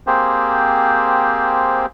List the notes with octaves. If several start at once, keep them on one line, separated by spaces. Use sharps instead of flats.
A#3 C4 G4 G#4 C5